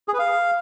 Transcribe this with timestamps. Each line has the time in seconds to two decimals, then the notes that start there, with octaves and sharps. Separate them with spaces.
0.08 G#4
0.13 B4
0.19 F5